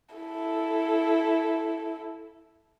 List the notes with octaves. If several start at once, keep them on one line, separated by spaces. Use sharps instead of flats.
E4 A4